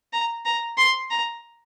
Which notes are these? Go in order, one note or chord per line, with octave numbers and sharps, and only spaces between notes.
A#5
A#5
C6
A#5